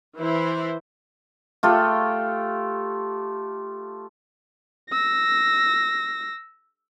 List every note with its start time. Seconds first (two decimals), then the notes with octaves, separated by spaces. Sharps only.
0.18 E3 E4 C5
1.63 A3 F4 G4
4.90 E6 A#6